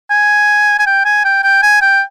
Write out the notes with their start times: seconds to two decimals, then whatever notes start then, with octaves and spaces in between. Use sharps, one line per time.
0.10 G#5
0.79 G#5
0.86 G5
1.05 G#5
1.25 G5
1.43 G5
1.63 G#5
1.82 G5